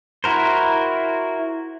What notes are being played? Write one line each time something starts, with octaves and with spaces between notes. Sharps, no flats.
E4 F#4 A#4 C5